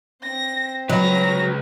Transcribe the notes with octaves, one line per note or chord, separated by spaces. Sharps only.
C4 A#6
C#2 F#3 B4 A#5 A#6